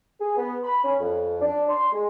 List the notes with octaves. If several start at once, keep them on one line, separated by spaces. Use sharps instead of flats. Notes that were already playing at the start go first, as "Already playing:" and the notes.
G#4
B3
B5
C#4
F2
D4
C6
G#3